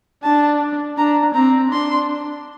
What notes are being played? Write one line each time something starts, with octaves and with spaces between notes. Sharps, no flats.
D4 A5
D4 A#5
C4 A#5
D4 C6